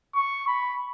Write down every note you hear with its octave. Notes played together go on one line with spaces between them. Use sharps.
C#6
B5